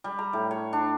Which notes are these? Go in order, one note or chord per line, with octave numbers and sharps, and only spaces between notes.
G3
A#5
A2
C#5
D4